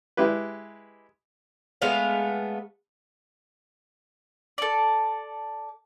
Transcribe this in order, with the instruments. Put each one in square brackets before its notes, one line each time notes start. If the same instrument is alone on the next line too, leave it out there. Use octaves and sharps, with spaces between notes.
[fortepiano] G#3 E4 G4 B4
[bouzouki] G#3 A3 B3 F5
[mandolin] A4 D5